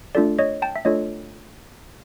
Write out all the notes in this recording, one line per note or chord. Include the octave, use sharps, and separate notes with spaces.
A3 D4 F4 A4 D5
C#5 D#5
G5 A5
E5
A3 D4 F4 A4 C#5 D#5